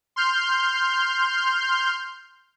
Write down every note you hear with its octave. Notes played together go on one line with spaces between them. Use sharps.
C6 F6 G6